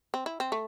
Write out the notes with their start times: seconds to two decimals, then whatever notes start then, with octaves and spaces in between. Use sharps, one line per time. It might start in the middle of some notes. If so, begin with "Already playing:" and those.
0.14 C4
0.26 E4
0.40 C4
0.52 A3